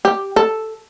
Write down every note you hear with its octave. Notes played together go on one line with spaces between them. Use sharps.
G4
A4